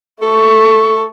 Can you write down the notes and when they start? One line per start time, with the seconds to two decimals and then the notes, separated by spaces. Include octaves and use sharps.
0.22 A3 A4 C#6